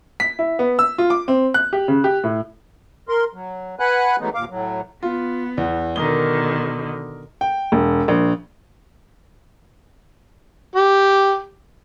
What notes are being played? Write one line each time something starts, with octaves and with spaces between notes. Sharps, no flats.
B6
E4
B3
E6
F4
D6
C4
F#6
G4
C#3
G4
A2
A#4 C6
F#3
B4 F#5 G#5 B5 F#6
E3 F#3 G#3 A3 B3 D#4
D#2 A#2 F5 D6
A2 F#3
B3 F4
E2
B2 D3 D#3 A#4 D#6 G7
G5
E1
A#1
G4